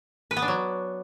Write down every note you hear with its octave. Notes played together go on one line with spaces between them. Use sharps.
B4
B3
D4
F#3